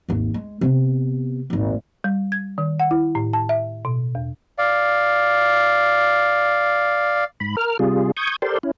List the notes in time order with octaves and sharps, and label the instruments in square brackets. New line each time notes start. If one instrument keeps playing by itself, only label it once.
[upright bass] G#1 D#2
G#3
C3 B3
D#1 G#1
[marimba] G3
G#6
D#3
F#5
E4
A2
A5
E5
B2
E2
[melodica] D5 F5
[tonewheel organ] G#2 B5
A#4 F6
C3 G3 F4 G#4
C#6 D#6 G6 G#6
G4 A4 A#4 C5 D5 C6
C#4 E4